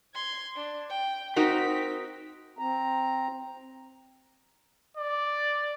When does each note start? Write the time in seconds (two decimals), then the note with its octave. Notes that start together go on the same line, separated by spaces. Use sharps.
0.15 C6 G#6
0.56 D4
0.90 G5
1.36 C4 D#4 F#4 A#4 B6
2.59 C4 A#5
4.97 D5